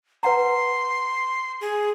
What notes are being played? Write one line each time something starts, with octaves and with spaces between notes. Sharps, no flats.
B4 F#5 A#5 C6
G#4